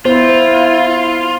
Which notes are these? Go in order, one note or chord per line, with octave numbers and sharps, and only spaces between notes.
B3 E4 F4 C5